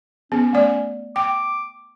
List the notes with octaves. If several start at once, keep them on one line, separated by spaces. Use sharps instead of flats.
B3 C#4
A3 D5
G5 D6